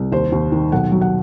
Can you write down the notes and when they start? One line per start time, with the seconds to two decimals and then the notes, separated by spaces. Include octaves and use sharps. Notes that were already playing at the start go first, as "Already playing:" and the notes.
Already playing: C2
0.12 D#2 C5
0.32 D#2
0.52 D#3
0.72 B1 F#5
0.92 F#3
1.01 F#5